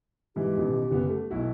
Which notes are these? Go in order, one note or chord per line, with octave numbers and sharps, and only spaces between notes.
G#2 E3 G4
A1 B2 D#3
F#1 B3
A3
B1 E4 F#4